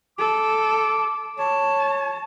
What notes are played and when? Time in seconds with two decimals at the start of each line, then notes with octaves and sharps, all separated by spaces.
0.19 A4 D6
1.39 C#5 A5